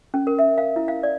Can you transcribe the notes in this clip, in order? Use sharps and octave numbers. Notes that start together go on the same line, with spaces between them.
C#4
A#4
E5
F5
E4
F5
D5